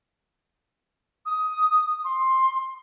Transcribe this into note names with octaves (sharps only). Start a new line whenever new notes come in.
D#6
C6